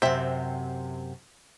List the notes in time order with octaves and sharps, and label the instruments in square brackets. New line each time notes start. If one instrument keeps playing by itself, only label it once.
[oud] F#2 C3 [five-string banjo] C4 E5